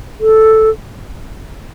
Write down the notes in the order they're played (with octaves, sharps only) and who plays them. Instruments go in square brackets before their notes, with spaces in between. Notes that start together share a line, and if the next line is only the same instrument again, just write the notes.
[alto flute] A4